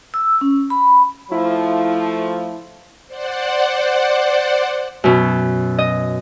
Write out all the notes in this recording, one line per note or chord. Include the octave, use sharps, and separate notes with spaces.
E6
C#4
B5
F3 A3 E4
C5 D5 F#5
F#2 B2
D#5